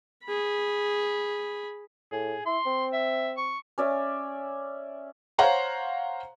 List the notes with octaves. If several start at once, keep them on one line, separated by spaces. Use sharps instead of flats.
G#4 B5
A2 G#4
E4 C6
C4
E5
C#6
C#4 D5 E5
C5 C#5 F5 F#5 A#5 C6